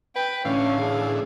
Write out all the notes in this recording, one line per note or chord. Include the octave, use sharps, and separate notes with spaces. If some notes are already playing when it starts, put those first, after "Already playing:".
B4 G5
A2 D3 E3 C#4 F5
G#4